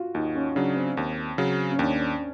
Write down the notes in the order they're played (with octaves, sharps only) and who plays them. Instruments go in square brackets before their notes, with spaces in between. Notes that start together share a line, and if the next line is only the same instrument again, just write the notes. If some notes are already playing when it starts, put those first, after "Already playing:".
Already playing: [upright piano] F4 F#4
[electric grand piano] D#2 [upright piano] D#4
[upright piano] C#4
[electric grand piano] C#3 F#3 [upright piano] D4
[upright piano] C4
[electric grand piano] D#2
C#3 F#3
[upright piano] C#4
[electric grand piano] D#2 [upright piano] D4